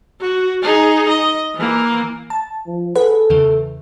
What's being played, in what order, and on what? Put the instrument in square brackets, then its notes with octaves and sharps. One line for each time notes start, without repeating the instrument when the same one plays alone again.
[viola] F#4
D#4 G#4
D#5
E3 A#3
[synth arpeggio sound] A5
[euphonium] F3
[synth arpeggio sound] G#4 B4 F#5 [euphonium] A4
[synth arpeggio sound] E2 C#3 E3